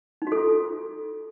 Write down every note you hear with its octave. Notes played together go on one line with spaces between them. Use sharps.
D#4
F#4
A4
F4